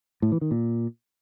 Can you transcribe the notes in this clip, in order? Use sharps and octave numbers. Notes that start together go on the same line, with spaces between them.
A2
E3
D#3
A#2